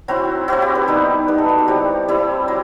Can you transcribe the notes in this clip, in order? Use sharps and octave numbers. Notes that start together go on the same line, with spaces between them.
F#3 C4 E4 F#4
F#3 C4 E4 F#4
G4
B4
G3 B3 D#4 B4
G3 B3 D#4 B4
A4
F#4
F#4
G3 C4 E4 G4
G3 C4 E4
F#3